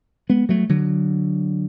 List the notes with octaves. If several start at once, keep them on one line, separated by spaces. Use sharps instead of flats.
G#3 B3
F#3 A3
D3 F#3